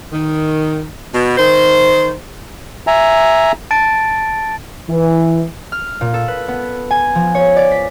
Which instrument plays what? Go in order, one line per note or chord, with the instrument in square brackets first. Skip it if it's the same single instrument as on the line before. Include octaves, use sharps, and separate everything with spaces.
[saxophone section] D#3
B2
D#3 C5
[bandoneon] E5 G#5 A#5
[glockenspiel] A5 A6 D7
[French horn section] E3
[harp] F6
A#2
A4
B4
B3
G#5
F3
C#5
D5
B6